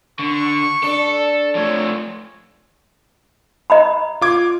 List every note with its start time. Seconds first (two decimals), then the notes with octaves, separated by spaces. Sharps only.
0.19 D3 C#6
0.83 D4 A4
1.56 F3 A3 C#5
3.70 D#5 A#5 B5
4.21 F4 D6 G#6